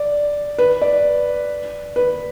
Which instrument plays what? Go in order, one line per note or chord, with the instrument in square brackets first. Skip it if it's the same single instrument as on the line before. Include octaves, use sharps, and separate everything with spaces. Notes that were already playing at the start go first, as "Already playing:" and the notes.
Already playing: [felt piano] D5
B4
D5
B4